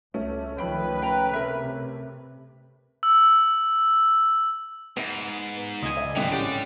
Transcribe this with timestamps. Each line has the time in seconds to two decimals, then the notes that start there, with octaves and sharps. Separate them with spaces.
0.14 C#2 A3 C#4
0.58 C#2 D#3 F3 B4 G5 B5
1.02 C#3 G5 A#5 B5
1.33 C3 A#4 E5
3.03 E6
4.97 G#2 B3 D#5
5.83 C#2 D#5 G#5
5.96 A4 D5 E5
6.16 G#1 A2 D3 F#3 C#4 D4 B4 G5
6.33 C#4 G4 D5 F#5 G5